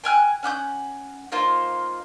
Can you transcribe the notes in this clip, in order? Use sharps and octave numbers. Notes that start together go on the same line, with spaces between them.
G5 G#5 F6 F#6
C#4 F#5 D6 G6
A#3 D#4 F4 C5